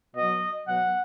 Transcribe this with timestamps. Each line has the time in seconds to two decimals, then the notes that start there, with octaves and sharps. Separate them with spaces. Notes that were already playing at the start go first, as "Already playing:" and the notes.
0.14 B2 D#5
0.20 F#3
0.64 B2 F#3 F#5